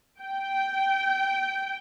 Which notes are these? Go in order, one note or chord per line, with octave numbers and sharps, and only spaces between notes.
G5